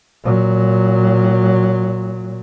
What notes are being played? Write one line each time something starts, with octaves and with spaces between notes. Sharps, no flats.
A#2 F#3